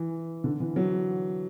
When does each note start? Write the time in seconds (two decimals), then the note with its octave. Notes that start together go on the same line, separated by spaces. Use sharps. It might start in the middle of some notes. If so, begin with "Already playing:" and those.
Already playing: E3
0.44 D3
0.60 E3
0.76 F#3